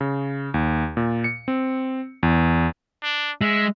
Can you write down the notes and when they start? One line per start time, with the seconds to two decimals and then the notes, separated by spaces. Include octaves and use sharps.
0.01 C#3
0.54 D#2
0.97 A#2
1.24 C#7
1.48 C4
2.23 E2
3.03 D4
3.41 G#3 E5